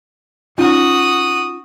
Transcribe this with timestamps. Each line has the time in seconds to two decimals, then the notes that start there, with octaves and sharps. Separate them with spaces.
0.58 C#4 D#4 F4 F#4 D#6